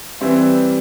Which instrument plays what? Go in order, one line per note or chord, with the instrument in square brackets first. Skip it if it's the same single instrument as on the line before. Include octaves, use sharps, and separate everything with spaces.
[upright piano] E3 G3 C4 E5